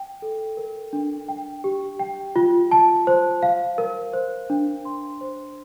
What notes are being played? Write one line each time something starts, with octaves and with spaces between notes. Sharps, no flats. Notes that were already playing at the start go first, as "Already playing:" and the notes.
Already playing: G5
A4
A#4
D4
G5
G4
G5
F4
A5
C5
F5
A#4
C5
D4
C6
C5